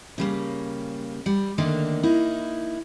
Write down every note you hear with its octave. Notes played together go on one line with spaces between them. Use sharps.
C#3 G3 A#3
G3
D3 D#3 A3 A#3 D4
A#3 D#4 E4